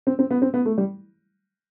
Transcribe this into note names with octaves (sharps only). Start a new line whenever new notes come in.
C4
C4
B3
C4
B3
A3
G3